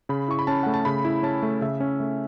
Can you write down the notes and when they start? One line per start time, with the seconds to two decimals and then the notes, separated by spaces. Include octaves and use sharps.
0.09 C#3 B5
0.28 E4 C#6
0.39 B5
0.47 C#4 A5
0.63 A3 F#5
0.74 A5
0.85 C#3 B5
1.05 E4
1.23 C#4 A5
1.43 A3
1.61 C#3 E5
1.80 C#4
2.00 A3